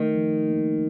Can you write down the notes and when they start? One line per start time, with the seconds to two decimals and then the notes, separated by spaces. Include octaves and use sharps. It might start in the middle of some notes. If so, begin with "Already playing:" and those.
Already playing: D#3 A3
0.15 F3
0.49 A#3